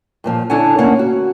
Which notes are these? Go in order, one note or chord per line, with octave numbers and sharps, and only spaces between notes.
G2 A#2 F3
D3 D4 E4 C#5 F#5 G#5
A2 D3 A#3 C#4 F#5
F#4